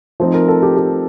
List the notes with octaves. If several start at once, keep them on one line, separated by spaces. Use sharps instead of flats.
F3 A3 C4 D#4 C5
A#4
A4
G4
G4